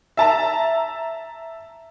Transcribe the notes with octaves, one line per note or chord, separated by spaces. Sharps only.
E5 A5 A#5